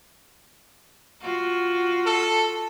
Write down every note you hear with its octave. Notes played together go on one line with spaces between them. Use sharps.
F4 F#4
A4